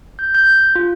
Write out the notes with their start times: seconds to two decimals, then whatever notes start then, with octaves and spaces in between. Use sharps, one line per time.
0.19 G6
0.35 G6
0.75 F4